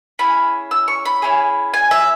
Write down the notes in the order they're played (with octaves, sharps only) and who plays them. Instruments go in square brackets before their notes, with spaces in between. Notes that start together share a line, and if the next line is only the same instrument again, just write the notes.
[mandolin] C#4 E4 G#4 B5
E6
C#6
B5
C#4 E4 G#4
G#5
E5